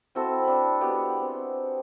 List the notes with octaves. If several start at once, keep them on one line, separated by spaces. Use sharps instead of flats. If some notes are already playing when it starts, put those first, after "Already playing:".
C4 E4 F#4 A4
D4 B5
G#3 B3 F#4 G4
C4